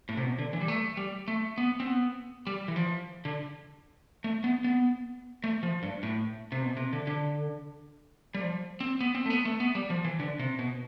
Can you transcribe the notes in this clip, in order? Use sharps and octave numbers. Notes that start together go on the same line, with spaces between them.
A2
C3
B2
D3
E3
G3
A3
G3
A3
B3
C4
B3
G3
E3
F3
D3
A3
B3
B3
A3
F3
G2
A2
C3
B2
C3
D3
D3
G3
F3
C4
B3
C4
A3
B3
A3
B3
G3
F3
E3
D3
C3
B2